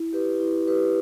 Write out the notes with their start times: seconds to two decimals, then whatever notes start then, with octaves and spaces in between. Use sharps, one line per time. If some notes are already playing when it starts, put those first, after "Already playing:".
Already playing: E4
0.13 G4 B4
0.40 E4
0.67 G4 B4